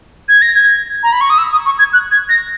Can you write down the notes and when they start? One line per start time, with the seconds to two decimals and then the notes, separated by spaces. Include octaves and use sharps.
0.29 G#6
0.42 A#6
0.55 G#6
1.03 A#5
1.12 B5
1.21 C#6
1.30 D#6
1.38 E6
1.52 D#6
1.65 C#6
1.79 G#6
1.93 F#6
2.11 G#6
2.29 A#6